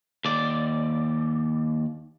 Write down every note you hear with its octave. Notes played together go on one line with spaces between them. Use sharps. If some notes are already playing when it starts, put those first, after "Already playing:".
D#2 D5